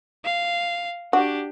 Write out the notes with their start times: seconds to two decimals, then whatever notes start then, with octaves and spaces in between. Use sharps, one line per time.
0.25 F5
1.13 D4 F#4 G4